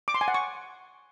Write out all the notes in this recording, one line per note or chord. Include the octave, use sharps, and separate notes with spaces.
D6
C6
G#5
F#5
C#6